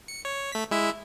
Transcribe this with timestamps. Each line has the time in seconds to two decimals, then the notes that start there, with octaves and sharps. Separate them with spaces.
0.08 C#7
0.25 C#5
0.52 A3 B6
0.71 G#3 E4 E5